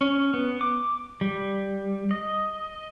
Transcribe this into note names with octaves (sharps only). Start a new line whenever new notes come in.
C#4
B3
D6
G3
D#5